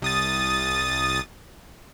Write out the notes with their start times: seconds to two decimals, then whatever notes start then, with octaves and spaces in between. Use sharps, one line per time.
0.02 C2 D#6 A6